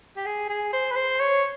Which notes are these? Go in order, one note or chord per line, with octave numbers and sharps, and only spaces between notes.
G4
G#4
G#4
C5
B4
C5
C#5